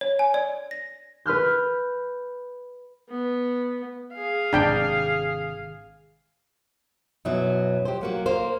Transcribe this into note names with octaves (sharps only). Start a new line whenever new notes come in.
C#5
G#5
D5
A#6
B4 B5 F6 G6
B3
G#4 F5
G#1 C3 D4 G5
F#2 B2 F#3 E4
G4 C5
F#3 A#3 F#4
A#3 C5